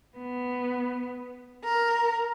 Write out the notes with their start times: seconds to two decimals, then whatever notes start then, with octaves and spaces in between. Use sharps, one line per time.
0.18 B3
1.65 A#4